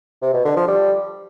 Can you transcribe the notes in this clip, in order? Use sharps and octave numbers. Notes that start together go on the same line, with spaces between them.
C3
B2
D3
F3
G3